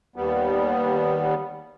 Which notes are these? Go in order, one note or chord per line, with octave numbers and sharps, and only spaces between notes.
D#2 G3 B3